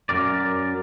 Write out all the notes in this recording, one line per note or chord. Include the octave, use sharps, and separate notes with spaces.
F#2 C#3 A#4 D5